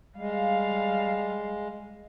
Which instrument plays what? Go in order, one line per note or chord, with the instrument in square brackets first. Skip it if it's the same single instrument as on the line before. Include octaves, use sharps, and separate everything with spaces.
[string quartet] G3 [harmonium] G#3 [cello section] F5